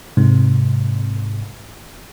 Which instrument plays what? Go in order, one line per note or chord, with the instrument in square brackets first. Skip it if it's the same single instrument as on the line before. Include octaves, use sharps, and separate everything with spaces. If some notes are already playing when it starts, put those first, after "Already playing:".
[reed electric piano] G#2 [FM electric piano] C3